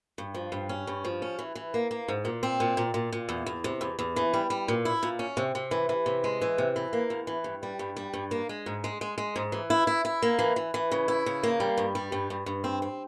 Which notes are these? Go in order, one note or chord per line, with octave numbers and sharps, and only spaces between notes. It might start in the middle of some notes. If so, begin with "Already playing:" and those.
G2
F3
G2
C#4
G2
F3
C#4
E3
E3
A#3
A#3
G#2
A#2
C4
A#2
A#2
A#2
A#2
E2
E2
C3
E2
E2
E3
G3
G3
A#2
E4
A#2
C#4
C3
C3
E3
E3
C3
G#3
E3
C3
E3
A#3
E2
E3
G2
G3
G2
G3
G2
A#3
G#3
G#2
G#3
G#3
G#3
G#2
E3
E4
E4
E4
A#3
E3
E3
E3
C#3
E4
C#3
A#3
G3
G2
G3
G2
G2
G2
C4
C4